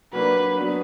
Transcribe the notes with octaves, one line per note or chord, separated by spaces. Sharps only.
F#3 A#3 D4 B4
F#3 B3 D4 F#4 B4